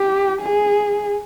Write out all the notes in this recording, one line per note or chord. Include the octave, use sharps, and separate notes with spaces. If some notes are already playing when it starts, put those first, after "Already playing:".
Already playing: G4
G#4